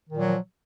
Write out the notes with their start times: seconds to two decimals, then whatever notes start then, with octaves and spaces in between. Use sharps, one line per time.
0.10 D#3
0.14 A#2
0.17 F#3
0.21 F3